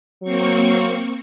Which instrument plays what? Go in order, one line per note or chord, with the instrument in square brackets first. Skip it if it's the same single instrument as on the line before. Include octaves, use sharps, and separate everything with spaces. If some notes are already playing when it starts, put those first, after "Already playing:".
[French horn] F#3 [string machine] A#3 C4 C#6